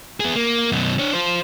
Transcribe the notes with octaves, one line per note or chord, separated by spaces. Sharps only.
B3 G#4
A#3
F#2 B2
D4 C#5
F4 C5